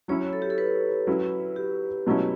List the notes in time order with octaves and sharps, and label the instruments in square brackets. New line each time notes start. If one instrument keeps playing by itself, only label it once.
[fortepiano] F#3 C#4 E4 [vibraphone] C#5
[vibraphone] A4
G4
A4
B4
[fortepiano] F#3 C#4 E4
[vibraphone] G4
[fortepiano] B2 F#3 A3 C#4 E4